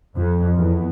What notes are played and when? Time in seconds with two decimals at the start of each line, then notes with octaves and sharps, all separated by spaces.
0.18 F2
0.57 E2